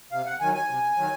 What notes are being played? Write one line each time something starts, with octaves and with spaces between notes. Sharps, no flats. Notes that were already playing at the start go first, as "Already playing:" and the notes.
C3 F5
F#5
D#3 F#3 G#5
G#5
C3
D#3 F#3